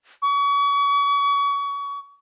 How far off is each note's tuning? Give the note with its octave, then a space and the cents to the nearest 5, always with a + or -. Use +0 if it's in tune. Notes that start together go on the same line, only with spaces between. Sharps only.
C#6 +35